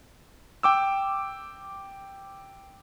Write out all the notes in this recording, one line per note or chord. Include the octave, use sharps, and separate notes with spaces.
G5 D6 E6